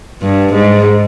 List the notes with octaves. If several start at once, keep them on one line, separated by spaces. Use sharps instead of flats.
G2
G#2